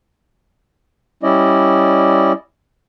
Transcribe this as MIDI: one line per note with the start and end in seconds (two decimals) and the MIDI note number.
1.23 2.32 55
1.23 2.32 61
1.23 2.32 64
1.23 2.32 74
1.23 2.32 75